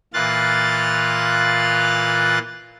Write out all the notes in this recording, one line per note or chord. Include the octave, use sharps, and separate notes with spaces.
A#2 E3 F4 F5 F#6 A6